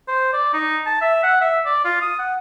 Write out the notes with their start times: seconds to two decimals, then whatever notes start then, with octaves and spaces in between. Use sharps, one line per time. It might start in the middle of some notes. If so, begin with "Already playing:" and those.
0.08 C5
0.33 D5
0.53 D#4
0.86 A5
1.02 E5
1.24 F#5
1.41 E5
1.66 D5
1.85 F4
2.02 D#6
2.19 F#5